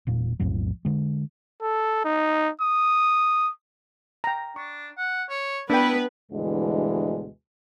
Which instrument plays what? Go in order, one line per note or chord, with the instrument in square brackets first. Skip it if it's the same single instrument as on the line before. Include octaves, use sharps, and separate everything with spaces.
[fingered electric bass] E1 A#2
B1 F2 A2 F#3
D3 G#3
[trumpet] A4
D#4
D#6
[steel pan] G5 A#5
[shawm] D4 [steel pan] C#6
[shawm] F#5
C#5
[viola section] B3 B4 [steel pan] D4 G5 [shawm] E4
[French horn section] D2 G2 B2 E3 G#3